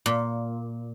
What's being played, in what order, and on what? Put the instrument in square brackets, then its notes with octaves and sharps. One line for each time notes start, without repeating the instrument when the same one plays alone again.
[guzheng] A#2